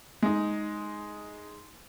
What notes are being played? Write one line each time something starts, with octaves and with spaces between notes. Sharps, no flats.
G#3 D#4